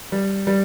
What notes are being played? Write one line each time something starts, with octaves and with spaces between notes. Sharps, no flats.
G3
G3